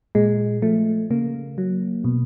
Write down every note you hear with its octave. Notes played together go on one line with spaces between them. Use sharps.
A#2 G#3
F3 A3
C#3 A#3
F#3
B2